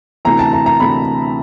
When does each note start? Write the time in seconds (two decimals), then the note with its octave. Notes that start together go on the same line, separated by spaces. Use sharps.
0.25 D2 C3 E3 A#5
0.39 A5
0.53 A#5
0.66 A#5
0.80 D2 C3 E3 B5